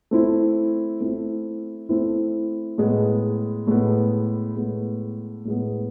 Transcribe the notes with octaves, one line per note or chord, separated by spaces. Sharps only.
A3 C4 E4
A3 C4 E4
A3 C4 E4
A2 G#3 B3
A2 G#3 B3
A2 G#3 B3
A2 G#3 B3